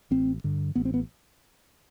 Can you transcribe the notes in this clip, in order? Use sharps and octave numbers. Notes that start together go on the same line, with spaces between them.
A1 C4
G2 D3
A1 B3
C4
B3